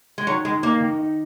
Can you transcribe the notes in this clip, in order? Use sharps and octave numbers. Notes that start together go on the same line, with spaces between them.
G#3
D#3 F#3
D#3 G#3
A#3 D#4
D#3
D#4